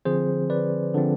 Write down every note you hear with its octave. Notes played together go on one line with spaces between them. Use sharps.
D3 F3 C4 G#4 C5
B4 D5
D3 F3 C4